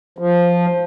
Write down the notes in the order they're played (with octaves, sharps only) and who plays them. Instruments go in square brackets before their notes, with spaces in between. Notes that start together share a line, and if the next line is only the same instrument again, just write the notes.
[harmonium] F3